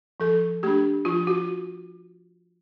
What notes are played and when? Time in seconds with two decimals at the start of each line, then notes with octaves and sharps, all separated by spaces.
0.20 F3 A4
0.63 A3 D4 G4
1.05 F3 F4
1.27 F#4